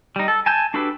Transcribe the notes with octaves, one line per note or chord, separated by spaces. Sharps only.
G3 D#4
A4
G#5 A5 G6
D4 F#4 G4 A4 B4